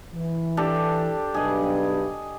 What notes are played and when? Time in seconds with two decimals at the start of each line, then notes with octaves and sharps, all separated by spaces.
0.13 E3
0.57 D4 G4 A4
1.34 B1 G2 G#4 D#5